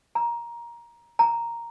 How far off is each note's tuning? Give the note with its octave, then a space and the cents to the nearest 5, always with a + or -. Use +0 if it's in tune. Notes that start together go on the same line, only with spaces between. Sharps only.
A#5 +15
A#5 +0